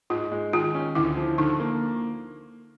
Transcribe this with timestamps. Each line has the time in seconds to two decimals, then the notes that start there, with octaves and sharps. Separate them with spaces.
0.10 G#2 F4
0.32 G#3
0.53 D#3 F4
0.75 C#4
0.95 D2 E4
1.17 F3
1.38 D3 D#4
1.60 A#3